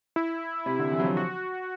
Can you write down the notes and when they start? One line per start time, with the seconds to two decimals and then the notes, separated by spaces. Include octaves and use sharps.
0.16 E4
0.66 C3
0.79 D3
0.92 E3
1.00 F#3
1.04 F3
1.17 F#4